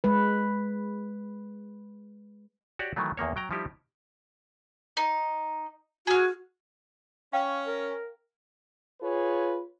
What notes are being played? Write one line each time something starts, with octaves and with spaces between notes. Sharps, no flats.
G#3 B4
F#4 G4 C#5 D5
D#3 E3 F#3 A3
E2 D#3 A#3 C#5
F#3 G5 A#5
F3 G3 D#4 E4 G4
D#4
F#4 G#4 F6
C#4 F5 G5
A#4
F4 G#4 B4 C#5